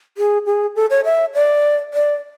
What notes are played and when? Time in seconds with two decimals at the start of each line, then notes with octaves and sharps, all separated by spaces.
0.18 G#4
0.46 G#4
0.76 A4
0.90 C#5
1.05 E5
1.35 D5
1.94 D5